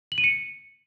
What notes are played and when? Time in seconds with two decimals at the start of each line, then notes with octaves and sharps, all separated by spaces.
0.12 F#7
0.18 D#7
0.24 C#7